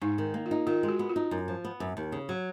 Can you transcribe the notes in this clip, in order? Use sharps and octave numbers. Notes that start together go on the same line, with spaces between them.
G#2 D#4
D#3
A#3
F4
D#4
D#3 F4
G#3
F#4
B3
F4
D#4
F#2
F3
B3
F#2
D#2
C#3
F#3